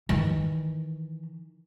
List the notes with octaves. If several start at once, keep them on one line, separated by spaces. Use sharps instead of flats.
D#3 E3